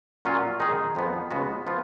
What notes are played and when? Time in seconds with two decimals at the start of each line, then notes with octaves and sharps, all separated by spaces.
0.25 A#2 F#3 C#4 F4
0.60 D#3 G#3 D#4 G#4
0.95 F2 F3 B3
1.31 C#2 C#3 G#3 B3 F#4
1.67 F3 B3 F4